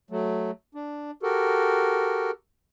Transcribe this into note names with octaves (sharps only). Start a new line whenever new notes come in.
F#3 A3
D4
F#4 G4 A4 A#4